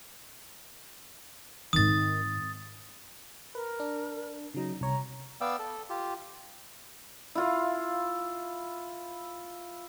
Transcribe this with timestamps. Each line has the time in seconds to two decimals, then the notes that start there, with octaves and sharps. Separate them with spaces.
1.73 G#2 D#3 C4 D#6 A6
3.55 A#4 B4
3.80 D4
4.54 C#3 F#3 D#4
4.81 C2 C#5 A#5
5.41 B3 D5 F5 G5 E6
5.59 A4
5.90 F4 G4
7.35 E4 F4 F5